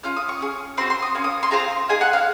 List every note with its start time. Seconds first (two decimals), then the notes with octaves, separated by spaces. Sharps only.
0.03 C#4 F4 F6
0.16 D#6
0.29 C#6
0.41 C#4 G#4
0.77 C4 C6
0.81 F#4
0.90 C6
1.02 D#6
1.15 A#3 C#4
1.24 D#6
1.43 C6
1.51 C4 F4 G#4 A#5
1.88 A#3 D#4 G#4 G#5
2.01 F#5
2.13 F5